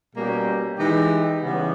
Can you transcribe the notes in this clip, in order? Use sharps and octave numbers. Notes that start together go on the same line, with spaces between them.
B2 G3 A#3 C#4 G4
E3 G#3 D#4 G4
C#3 E3 G3 B3